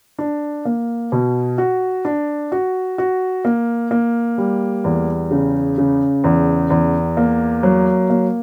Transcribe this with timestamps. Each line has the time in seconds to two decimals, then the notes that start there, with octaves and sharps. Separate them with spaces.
0.19 D4
0.65 A#3
1.12 B2
1.58 F#4
2.05 D4
2.52 F#4
2.98 F#4
3.45 A#3
3.91 A#3
4.38 G3
4.84 E2
5.31 C#3
5.78 C#3
6.24 E2
6.70 E2
7.17 A#3
7.63 F#3
8.10 A#3